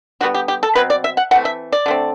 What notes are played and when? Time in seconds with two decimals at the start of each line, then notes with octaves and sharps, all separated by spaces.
0.21 D3 G3 B3 F#4
0.35 G4
0.48 G4
0.63 A4
0.75 B2 F#3 C4 B4
0.90 D5
1.04 E5
1.17 F#5
1.31 E3 A3 C4 F#5
1.45 E5
1.72 D5
1.86 D3 A3 C4